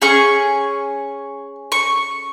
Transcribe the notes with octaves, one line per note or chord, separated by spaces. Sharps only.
C#4 G#4 C#6
C#6